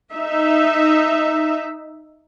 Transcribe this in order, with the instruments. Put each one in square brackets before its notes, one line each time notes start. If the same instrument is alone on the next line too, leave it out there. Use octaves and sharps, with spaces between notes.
[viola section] D#4 E5